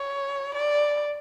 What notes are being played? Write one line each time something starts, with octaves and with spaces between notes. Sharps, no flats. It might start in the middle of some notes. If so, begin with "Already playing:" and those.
Already playing: C#5
D5